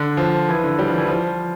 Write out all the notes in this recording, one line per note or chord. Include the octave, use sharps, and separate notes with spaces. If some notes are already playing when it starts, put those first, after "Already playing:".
Already playing: D3
F3
E3
D3
G3
F3
E3
F3